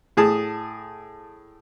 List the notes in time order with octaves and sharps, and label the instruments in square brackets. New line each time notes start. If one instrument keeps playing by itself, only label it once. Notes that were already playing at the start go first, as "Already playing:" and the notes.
[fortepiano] A2 G#4 A5